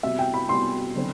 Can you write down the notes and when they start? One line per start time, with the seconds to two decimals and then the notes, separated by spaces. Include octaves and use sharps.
0.03 C3 G3 B3 F#4 E5
0.19 G5
0.34 B5
0.49 C3 G3 B3 F#4 C6
0.95 D3 F#3 C4